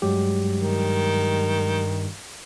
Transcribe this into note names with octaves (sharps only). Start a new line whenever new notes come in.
G2 F#3 G#3 G4
D#3